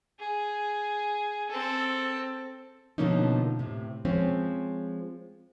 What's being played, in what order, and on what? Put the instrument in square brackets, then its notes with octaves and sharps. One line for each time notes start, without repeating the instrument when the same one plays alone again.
[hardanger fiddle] G#4
C4 A4
[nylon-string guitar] B2 D3 F3 A#3 C#4 D#4
A2 C3
F3 G#3 C4 C#4